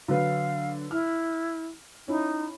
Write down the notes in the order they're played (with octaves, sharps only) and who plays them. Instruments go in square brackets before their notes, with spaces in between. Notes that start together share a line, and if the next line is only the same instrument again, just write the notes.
[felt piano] D3 F#3 B4 [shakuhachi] F5
[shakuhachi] E4 [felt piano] F6
[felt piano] C#4 E4 [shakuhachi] D#4